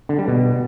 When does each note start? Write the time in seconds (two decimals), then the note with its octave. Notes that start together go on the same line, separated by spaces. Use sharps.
0.09 D3
0.19 G3
0.28 B2